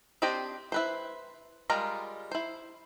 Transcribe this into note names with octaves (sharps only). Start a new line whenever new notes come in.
C4 D4 G4 C5 D#5
E4 B4 C5
G3 G#3 F4 A#4 A#5
E4 C5